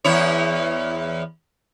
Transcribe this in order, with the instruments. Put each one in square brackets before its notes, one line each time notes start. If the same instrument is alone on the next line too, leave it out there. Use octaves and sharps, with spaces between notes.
[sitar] E2 E4 C#5